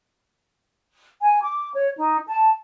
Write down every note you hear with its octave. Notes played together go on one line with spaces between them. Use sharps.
G#5
D6
C#5
D#4
A5